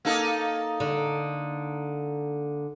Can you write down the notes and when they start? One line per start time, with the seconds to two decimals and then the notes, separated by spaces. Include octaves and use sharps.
0.05 A#3 D#4 A4
0.80 D3